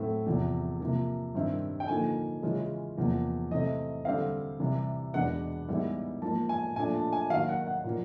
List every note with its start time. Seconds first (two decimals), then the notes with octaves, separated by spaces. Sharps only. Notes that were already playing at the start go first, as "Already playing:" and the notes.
Already playing: A2 F#3 A3 C4 E4 E5
0.27 E2 C3 F3
0.80 C3 F3 A#3
1.35 G2 D#3 G3 C4 E4
1.80 G5
1.88 D3 F3 A#3 D#4 G#5
2.43 C#3 E3 G#3 C#4 F4
2.97 E2 C3 F3 A#3
3.51 C3 E3 A3 C4 D#5
4.05 D3 G3 C4 E4 F5
4.60 C3 E3 G3
5.14 E2 B2 G#3 B3 D4 F#5
5.68 G#2 E3 G3 B3 E4
6.22 G#2 F3 A#3 A5
6.49 G#5
6.76 A#2 F3 A3 D4 G#5
6.94 A5
7.13 G#5
7.30 D#3 F#3 A#3 F5
7.49 F#5
7.67 F#5
7.84 A#2 F3 A#3